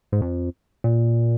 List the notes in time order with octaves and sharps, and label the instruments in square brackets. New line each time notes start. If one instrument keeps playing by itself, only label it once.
[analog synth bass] G#2
F2
A#2